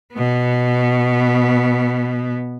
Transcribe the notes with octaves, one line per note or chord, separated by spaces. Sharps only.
B2 B3